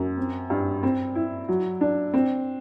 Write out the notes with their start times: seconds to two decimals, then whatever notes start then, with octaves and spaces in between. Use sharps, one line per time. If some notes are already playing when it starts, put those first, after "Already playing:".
Already playing: F#2
0.17 C4
0.50 G2
0.83 C4
1.15 E4
1.48 F#3
1.81 D4
2.14 C4